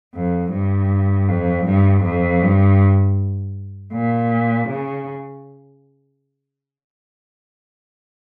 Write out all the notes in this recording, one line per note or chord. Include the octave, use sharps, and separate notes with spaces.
F2
G2
F2
G2
F2
G2
A#2
C#3